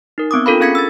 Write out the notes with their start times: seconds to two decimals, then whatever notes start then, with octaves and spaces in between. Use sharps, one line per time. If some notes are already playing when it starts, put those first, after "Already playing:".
0.18 D#4 A#4
0.31 B3 C4 D6 D#6
0.46 D4 F4 A4 A#4 F5 B5
0.60 C#4 G#4 F5 G#6 B6 C#7
0.75 E6 A6